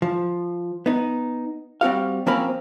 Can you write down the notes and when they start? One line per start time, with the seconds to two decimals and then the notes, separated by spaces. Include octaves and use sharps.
0.02 F3
0.86 B3 D#4
1.81 G3 C4 F#4 F5
2.26 F3 A#3 C4 C#4 F5 B5